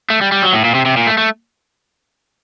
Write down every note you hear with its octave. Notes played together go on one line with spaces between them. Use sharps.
A3
G3
G3
F#3
A2
A#2
C3
C3
A#2
A3
A3